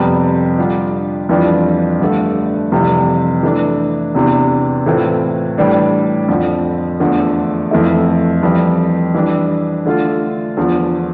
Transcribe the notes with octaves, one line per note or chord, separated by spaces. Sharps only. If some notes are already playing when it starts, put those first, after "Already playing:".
Already playing: F2 C3 G3 B3
D3 G3 D4 F4
F2 E3 G3 D4 F4
G2 D3 A3
F2 C3 E3 G3
E3 A3 D4
E2 C3 E3 B3 D4
A2 E3 A3 C4 F4
A2 E3 G3 D4
F2 D3 F3
E2 D3 F3 A3
F2 E3 A3 E4
F2 E3 G3
E3 G3 D4
D3 A3 D4 F4
E2 D3 F3